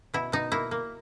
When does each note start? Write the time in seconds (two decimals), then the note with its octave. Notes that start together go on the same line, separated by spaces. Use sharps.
0.14 B2 E4
0.32 B2 D#4
0.52 A#3 E4
0.71 A#3